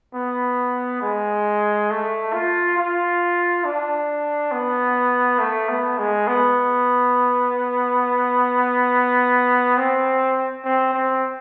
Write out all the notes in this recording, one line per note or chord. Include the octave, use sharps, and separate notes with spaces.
B3
G#3
A3
F4
F4
D4
B3
A3
B3
G#3
B3
C4
C4
C4